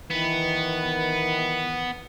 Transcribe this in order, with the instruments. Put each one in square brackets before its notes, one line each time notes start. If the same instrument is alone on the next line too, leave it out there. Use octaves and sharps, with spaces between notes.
[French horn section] D#3 E3 [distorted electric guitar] B3